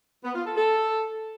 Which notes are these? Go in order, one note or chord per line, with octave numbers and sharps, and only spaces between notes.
B3
F4
A4
A4